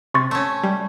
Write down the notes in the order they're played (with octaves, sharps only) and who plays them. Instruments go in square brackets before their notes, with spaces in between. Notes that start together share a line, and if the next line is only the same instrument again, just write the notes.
[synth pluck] C3 [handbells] C6 C#6 A6
[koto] A3 C#4
[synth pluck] G3